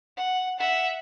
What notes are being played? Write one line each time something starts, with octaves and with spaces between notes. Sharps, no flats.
F#5
E5 F#5